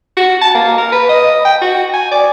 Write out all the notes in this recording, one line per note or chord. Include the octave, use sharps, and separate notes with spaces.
F#4
A5
A#3
A#4
B4
D#5
G5
F#4
G#5
D5